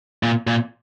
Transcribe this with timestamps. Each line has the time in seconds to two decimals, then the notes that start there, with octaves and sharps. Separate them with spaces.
0.23 A#2
0.47 A#2